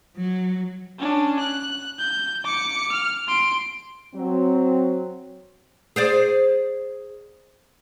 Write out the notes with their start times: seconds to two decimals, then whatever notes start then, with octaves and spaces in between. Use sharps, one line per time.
0.17 F#3
0.98 C#4 D4
1.39 F#6
1.99 G6
2.44 D6 C#7
2.92 F6
3.27 C6 D7
4.15 F#3 C4
5.96 G#4 C5 D5